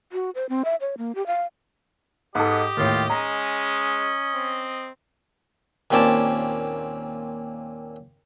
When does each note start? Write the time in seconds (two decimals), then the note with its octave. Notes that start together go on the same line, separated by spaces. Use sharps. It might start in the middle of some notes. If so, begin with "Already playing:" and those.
0.12 F#4
0.35 C5
0.49 C4
0.65 E5
0.81 C#5
0.98 A#3
1.15 G4
1.27 F5
2.35 G#2 B3 G4 A4 D#5
2.77 D#2 A2 F4
3.10 G#3 C#4 A#5
4.35 C4
5.91 D#2 A#2 C4 C#4 D5 A5